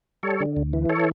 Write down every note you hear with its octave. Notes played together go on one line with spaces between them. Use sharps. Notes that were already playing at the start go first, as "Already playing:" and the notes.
G3 A4 C#5
D3
D2
E3
A4 C#5